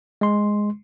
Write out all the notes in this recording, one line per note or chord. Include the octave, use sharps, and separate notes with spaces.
G#3 C6